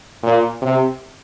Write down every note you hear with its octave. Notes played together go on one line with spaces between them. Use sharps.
A#2
C3